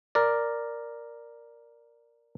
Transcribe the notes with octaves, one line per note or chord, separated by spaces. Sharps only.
A#4 D5